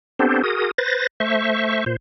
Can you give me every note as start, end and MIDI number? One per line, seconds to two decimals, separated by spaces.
0.19 0.42 59
0.19 0.42 60
0.19 0.42 62
0.19 0.42 67
0.19 0.42 69
0.19 0.42 72
0.43 0.71 66
0.43 0.71 68
0.43 0.71 70
0.43 0.71 87
0.78 1.07 71
0.78 1.07 72
0.78 1.07 93
0.78 1.07 94
1.20 1.84 57
1.20 1.84 72
1.20 1.84 76
1.20 1.84 85
1.86 1.96 46
1.86 1.96 72